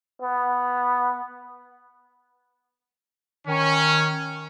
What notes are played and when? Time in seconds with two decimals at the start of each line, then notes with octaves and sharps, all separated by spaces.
0.22 B3
3.48 D#3 C#4